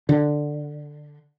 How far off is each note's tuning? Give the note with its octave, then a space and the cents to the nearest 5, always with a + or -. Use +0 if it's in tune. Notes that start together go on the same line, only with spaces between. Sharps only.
D3 +10